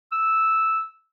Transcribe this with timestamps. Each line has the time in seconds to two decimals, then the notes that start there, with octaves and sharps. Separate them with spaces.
0.12 E6